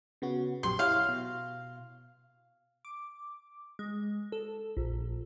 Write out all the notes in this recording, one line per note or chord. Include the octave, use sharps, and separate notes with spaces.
C#3 B3 F#4
A#1 F#2 G4 C6
E4 G4 C#5 F5
B2
D6
G#3
A4
A#1